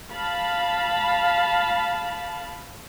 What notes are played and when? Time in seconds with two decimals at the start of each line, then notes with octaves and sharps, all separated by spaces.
0.12 F5 A5 B5